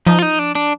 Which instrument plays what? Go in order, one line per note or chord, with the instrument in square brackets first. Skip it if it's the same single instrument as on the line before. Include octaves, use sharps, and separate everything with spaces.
[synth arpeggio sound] F3 [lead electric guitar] D#4
[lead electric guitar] F4
D#4
D4
D4